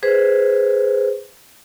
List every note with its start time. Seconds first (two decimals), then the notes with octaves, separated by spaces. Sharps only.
0.03 G#4 B4 C5